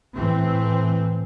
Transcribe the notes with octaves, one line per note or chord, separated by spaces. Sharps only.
A2 E3 C4